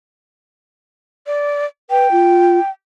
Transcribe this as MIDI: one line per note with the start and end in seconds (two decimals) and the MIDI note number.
1.27 1.65 74
1.90 2.07 71
1.90 2.70 79
2.12 2.59 65